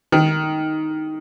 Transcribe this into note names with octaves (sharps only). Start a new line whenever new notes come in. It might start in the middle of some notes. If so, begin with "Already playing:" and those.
D#3